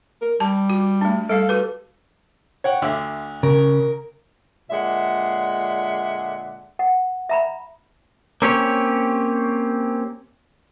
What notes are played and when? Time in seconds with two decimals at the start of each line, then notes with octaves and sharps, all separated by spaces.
0.22 A#4
0.40 G3 A5
0.70 F#4
1.01 A3 D4
1.29 G3 A4 F5
1.49 F#4 G4 B4
2.64 C#5 F#5 G5
2.82 D2 D3 E5
3.43 C#3 A#4
4.70 A#2 D3 G#3 E5 F#5
6.79 F#5
7.29 E5 A#5 B5
8.42 A#3 C4 C#4 G4 C#5